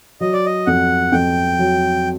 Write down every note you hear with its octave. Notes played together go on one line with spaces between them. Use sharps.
F#3 D#5
D5
D#5
F2 F#5
F2 G5
F#3